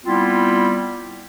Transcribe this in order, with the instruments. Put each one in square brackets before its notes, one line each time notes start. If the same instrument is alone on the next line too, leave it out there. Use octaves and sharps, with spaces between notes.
[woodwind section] G3 B3 C4 E4 F4